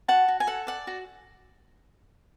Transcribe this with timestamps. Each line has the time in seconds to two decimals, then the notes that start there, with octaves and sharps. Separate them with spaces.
0.08 F#4 F#5 A5
0.28 F#4
0.40 G#5
0.47 A4 F#5
0.67 D5 F#5
0.87 F#4